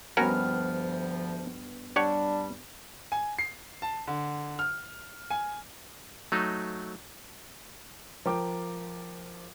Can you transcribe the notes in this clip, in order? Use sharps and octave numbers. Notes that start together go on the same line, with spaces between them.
D2 G2 F3 B3 C#4 F#4 A#4 F6
G3 D4 G4 C#5 F#5
G#5
C7
A5
D3
F6
G#5
F#3 A3 D#4
F3 A#4 G5 D6